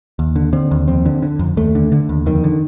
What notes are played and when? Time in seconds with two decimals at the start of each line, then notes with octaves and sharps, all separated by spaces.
0.19 D#2
0.36 D3
0.53 D3 C4
0.71 D#2
0.88 F2 C4
1.05 D3
1.22 D3
1.39 F2
1.57 D#2 A3
1.75 D3
1.92 D3
2.09 D#2
2.26 F2 D#3
2.44 D3